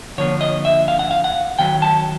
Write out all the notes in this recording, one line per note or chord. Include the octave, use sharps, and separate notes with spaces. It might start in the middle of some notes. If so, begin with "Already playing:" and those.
D3 F3 A#3 D4 C#5
D#5
E5
F5
F#5
F5
F#5
D#3 F#3 B3 G5
A5